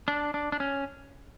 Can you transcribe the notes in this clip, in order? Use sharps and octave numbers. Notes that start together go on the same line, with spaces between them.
D4
D4
D4
C#4